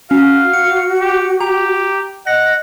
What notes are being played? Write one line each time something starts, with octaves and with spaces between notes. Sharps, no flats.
C#4 F#4 F5
C#7
G4
G4 A#5
D#5 F#5 A#6